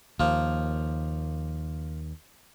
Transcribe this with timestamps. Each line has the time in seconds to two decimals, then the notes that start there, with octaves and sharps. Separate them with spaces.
0.20 D#2 F3 A#3